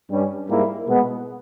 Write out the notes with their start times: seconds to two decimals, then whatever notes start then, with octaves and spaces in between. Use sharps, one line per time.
0.10 G2 G3 C#4
0.49 G#2 G3 A#3 E4
0.86 B2 G#3 B3